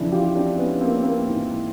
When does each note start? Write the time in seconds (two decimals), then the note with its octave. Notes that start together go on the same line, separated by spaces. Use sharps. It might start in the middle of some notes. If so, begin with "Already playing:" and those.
Already playing: F2 C#3 E3 D4 E4
0.12 F4 G4
0.35 C4 D4
0.58 B3 C#4
0.81 A#3 C4
1.03 A#3 C4
1.26 G#2 E3